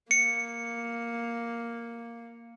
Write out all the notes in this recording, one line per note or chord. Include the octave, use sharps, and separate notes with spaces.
A#3 C#7